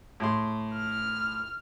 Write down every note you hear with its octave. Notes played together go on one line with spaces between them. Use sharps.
A2 C6
F6